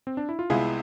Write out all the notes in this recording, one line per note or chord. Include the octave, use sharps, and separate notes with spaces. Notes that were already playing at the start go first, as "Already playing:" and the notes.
C4
D4
E4
F4
C2 C3 G#3 B3 E4 F4 G#4